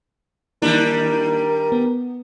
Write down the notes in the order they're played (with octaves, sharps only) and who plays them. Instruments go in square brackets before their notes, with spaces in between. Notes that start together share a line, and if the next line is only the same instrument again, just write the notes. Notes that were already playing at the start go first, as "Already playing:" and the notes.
[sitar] D#3 G3 D4 [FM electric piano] A#3 E4 [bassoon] A#4
[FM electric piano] B3